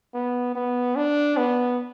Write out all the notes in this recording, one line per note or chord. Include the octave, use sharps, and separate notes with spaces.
B3
B3
D4
B3